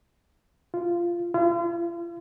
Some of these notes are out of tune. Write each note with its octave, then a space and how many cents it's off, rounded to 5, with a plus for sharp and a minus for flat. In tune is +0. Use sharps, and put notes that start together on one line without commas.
F4 -15
F4 -45